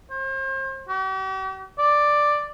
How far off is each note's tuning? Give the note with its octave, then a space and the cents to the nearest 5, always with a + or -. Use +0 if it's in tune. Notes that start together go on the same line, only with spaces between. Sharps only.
C5 +40
G4 -45
D5 +5